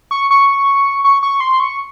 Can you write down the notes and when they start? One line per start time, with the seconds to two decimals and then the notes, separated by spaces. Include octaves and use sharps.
0.11 C#6
0.31 C#6
1.05 C#6
1.23 C#6
1.40 C6
1.60 C#6